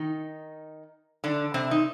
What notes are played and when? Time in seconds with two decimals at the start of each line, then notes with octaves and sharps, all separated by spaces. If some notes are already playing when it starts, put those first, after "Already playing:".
Already playing: D#3 D#4
1.24 D3 D4
1.54 C3 C4
1.71 D#4